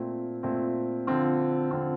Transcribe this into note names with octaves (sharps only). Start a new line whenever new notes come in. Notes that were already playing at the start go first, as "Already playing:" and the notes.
Already playing: A#2 A3 C4
A#2 A3 C4
D3 F3 C4 F4
D3 F3 C4 F4